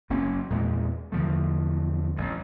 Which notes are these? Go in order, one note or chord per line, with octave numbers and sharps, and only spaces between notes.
F#1 A#3 C#4
E2 A#2 G#3
E2 D3 F3 A3
A1 G2